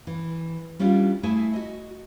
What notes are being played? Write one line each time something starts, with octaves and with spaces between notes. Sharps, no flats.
E3
G3 C#4 D4 E4 F4
A3 E4 G#4 E5 G#5
F#4 D#5